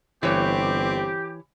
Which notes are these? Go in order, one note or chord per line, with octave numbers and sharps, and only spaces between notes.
G1 E3 C4 G4 C#5